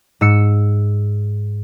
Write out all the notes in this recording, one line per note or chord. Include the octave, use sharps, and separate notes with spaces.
G#2 E6 C#7